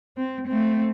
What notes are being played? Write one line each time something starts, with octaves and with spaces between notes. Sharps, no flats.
C4
A3 C4